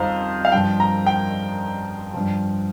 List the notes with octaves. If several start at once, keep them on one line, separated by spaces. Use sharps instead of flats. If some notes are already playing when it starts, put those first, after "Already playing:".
Already playing: F2 D#3 G3 C5 F5 A#5
F5
G2 F3 G5
A#5
G5
G2 F3